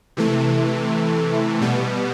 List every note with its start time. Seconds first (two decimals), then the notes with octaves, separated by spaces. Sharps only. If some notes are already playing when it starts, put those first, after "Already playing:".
0.17 C3 E3 A3
1.61 B2 G3 B3